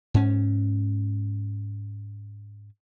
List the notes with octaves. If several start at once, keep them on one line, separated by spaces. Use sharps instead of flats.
G#2 C#4